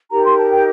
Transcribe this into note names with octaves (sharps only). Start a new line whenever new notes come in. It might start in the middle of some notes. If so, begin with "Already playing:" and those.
D#4 G4 A#4 A#5
C6
A5
G5